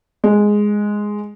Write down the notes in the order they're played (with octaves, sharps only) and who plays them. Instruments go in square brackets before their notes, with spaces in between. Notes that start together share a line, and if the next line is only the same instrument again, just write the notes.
[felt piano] G#3